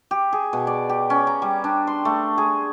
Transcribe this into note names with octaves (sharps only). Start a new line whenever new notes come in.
G4
G#4
B2
D5
G4
C#4
A#5
G3
D4
C6
A3
G#4